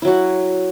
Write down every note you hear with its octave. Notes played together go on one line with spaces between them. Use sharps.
F#3 E4 F#4